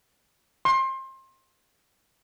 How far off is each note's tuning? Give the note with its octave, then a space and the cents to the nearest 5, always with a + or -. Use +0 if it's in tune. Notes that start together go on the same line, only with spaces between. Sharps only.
C6 +25